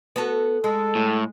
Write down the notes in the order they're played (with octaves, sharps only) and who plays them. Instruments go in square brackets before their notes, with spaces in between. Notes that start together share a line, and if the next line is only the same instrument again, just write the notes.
[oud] B3 F#4 A4
[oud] G#3 [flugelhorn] A4
[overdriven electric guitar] A2